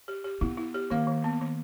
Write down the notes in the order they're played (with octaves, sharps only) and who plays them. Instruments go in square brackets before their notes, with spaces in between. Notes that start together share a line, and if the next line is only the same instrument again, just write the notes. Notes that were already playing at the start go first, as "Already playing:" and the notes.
[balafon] G4
G4
[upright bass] B3 [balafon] E4
[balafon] E4
G4
[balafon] D#3 [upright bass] A#3
[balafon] D#3
B3
D#3